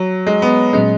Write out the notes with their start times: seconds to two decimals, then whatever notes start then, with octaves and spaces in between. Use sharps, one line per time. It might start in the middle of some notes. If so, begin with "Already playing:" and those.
Already playing: F#3
0.27 G#3
0.42 B3
0.73 A#2 F#3 G#3 C#4